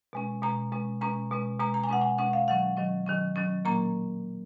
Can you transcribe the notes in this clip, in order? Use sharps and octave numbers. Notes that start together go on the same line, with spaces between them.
B2 G#3 C#4
B2 G#3 C#4 A#5
B2 G#3 C#4
B2 G#3 C#4 A#5
B2 G#3 C#4
B2 G#3 C#4 A#5
A#5
G#5
B2 G#3 C#4 F#5
G#5
B2 G#3 C#4 F#5
F5
D#3 F#3 C#4 F#5
D#3 F#3 C#4
D#3 F#3 C#4
D#3 F#3 C#4
A#2 F#3 A#3 C#4 A#5